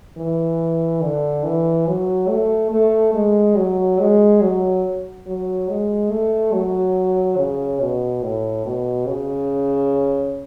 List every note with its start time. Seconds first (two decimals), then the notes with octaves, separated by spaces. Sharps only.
0.17 E3
1.02 D3
1.44 E3
1.87 F#3
2.29 A3
2.71 A3
3.14 G#3
3.57 F#3
3.99 G#3
4.41 F#3
5.26 F#3
5.69 G#3
6.11 A3
6.53 F#3
7.38 C#3
7.80 B2
8.23 A2
8.65 B2
9.07 C#3